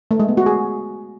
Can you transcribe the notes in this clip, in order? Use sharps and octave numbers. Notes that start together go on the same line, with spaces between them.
A3
G#3
B3
F#4
G#4